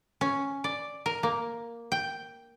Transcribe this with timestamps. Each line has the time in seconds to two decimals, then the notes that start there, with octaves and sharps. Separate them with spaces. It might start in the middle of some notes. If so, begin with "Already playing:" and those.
0.21 C#4
0.64 D5
1.06 A#4
1.23 A#3
1.92 G5